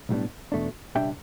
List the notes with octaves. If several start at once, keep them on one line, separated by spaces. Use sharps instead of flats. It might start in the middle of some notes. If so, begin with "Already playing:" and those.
B1 A2 G3 B3 D4
E2 B2 A3 D4
C#2 B2 G3 D4 E5 G5